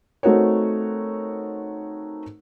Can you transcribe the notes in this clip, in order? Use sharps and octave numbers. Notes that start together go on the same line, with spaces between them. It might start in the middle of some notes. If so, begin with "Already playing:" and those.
A3 C4 D#4 F#4 A#4 C#5